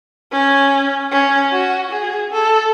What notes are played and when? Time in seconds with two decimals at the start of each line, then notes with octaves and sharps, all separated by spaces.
0.32 C#4
1.12 C#4
1.52 F#4
1.92 G#4
2.32 A4